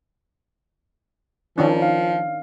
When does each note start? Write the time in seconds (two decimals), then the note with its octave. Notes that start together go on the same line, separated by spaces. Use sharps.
1.58 D#3 F3 C#4 D4
1.82 F5